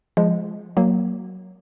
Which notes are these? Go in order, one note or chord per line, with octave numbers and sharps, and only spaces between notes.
F3 G#3
F#3 A#3